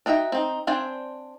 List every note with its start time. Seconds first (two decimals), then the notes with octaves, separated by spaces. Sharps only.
0.06 D4 D#4 F#4 E5 G5
0.32 C4 D#4
0.67 C4 D4 C5 D5 G#5